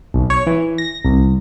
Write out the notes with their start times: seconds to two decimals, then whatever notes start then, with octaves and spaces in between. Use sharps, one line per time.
0.14 B1
0.30 C#5
0.47 E3
0.78 A#6
1.05 C2